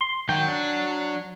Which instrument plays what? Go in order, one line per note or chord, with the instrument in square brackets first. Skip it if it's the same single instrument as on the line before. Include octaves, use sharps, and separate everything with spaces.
[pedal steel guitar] C6
[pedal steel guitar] D#3 G5 [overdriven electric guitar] F#3 F#4
[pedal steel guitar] D4